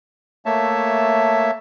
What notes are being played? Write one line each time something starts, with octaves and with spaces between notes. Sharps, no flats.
A3 A#3 C#5 E5 A5